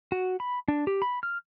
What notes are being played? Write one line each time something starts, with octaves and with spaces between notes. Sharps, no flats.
F#4
B5
D4
G4
B5
F6